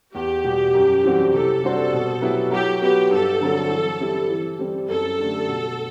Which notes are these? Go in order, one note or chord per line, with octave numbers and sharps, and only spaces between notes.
E2 G4
B2 G3
F#2
E3 G3 C4 F#4
C3 A4
G3 D4 F#4 C5
B2
F#3 B3 E4 G4
F#3 G4
B3 F#4 G4 B4
G2 A4
D3 F#3 C4
E3
G3 C4 E4 G4
E3
G3 C4 G4
F#2 A4
D3 A3 D4 G4
B2